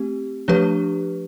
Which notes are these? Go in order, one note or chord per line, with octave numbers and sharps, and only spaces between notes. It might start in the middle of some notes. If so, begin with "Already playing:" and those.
Already playing: A3 C4 G4
F3 A3 D4 G4 B4